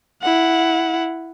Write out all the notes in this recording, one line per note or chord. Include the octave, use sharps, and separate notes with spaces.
E4 F#5